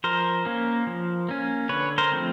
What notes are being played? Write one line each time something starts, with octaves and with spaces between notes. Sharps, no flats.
F3 A#4 C5
A#3 C#4
F3
A#3 C#4
D3 B4 C#5
A#4 C5
F3 A3 C4